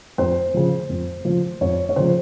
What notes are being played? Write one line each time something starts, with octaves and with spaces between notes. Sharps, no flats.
F2 C5
C#3 F3
F2
C#3 F3
F2 C#5
C#5
C#3 F3 C5